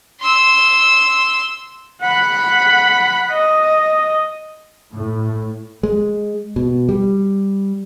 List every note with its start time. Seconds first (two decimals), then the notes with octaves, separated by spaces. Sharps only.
0.21 C6 E6
2.01 F#5 B5
3.30 D#5
4.94 A2
5.83 G#3
6.56 B2
6.89 G3